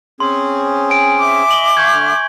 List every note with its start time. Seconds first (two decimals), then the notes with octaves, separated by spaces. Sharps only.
0.20 C4 C#4 G#4 C6
0.90 G#5 D7
1.20 E5 D6
1.51 D#5 F#7 G7
1.77 F5 F#5 A5 C#6 G6 G#6
1.92 D3 A3 F6